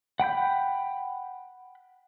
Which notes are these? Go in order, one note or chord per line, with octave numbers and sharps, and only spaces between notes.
F#5 G5 B5 G6